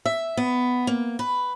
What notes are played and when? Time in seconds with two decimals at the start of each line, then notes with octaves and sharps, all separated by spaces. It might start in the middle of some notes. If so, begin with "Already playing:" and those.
0.06 E5
0.37 B3
0.87 A#3
1.19 B4